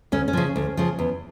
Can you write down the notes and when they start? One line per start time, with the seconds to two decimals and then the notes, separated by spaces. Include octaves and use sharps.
0.12 D2 C#4
0.28 C#4
0.33 C#3 F3
0.56 D2
0.77 C#3 F3
0.99 E2